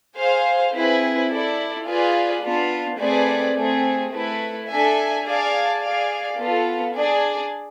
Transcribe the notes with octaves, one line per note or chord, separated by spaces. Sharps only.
G#4 C5 F5
C4 E4 G#4 B4
E4 A4 D5
F4 G#4 B4 D5
B3 D4 F4
A3 C4 G#4 B4 D5
A3 C4 G#4
A3 E4 B4
D4 A4 E5 G#5
G#4 D5 F5 A5
G#4 D5 F5
B3 F4 A4
D4 G#4 D5